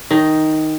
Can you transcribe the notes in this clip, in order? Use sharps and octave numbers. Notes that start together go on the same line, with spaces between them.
D#3 D#4